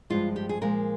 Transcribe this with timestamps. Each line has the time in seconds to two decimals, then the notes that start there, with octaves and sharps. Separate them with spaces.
0.10 G2 F3 G#3 F4
0.36 G4
0.49 G#4
0.61 A#2 F3 G#3 A#4